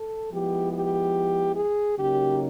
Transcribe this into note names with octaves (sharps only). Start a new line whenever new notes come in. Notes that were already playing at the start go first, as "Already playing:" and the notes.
Already playing: A4
F3 G#3 B3 E4 G4
G4
G#4
C#3 F#3 A#3 D#4 G4